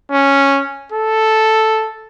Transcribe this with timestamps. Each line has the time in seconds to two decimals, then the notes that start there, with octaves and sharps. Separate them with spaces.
0.12 C#4
0.92 A4